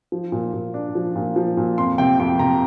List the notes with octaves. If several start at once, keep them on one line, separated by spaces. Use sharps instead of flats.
F3
A#2
A#2
D4
F3
A#2
F3
A#2
F2 C6
C3 G5
F2 G5
C3 A#5